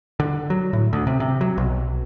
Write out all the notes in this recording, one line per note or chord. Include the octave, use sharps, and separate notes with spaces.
D3
F#3
A2
D2
C3
C3
F#3
B1